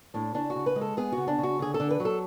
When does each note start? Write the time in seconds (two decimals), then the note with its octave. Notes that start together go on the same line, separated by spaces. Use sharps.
0.14 A2 D4
0.34 C#3 D4
0.50 F#4
0.55 C#3
0.66 B4
0.76 G#3
0.81 A4
0.97 B3 G#4
1.12 C#3 F#4
1.28 D4
1.38 C#3
1.43 F#4
1.59 D3 G#4
1.74 A4
1.80 D3
1.90 B4
2.00 F#3
2.05 A4